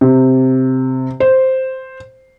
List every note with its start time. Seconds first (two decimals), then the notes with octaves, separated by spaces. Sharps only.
0.01 C3
1.20 C5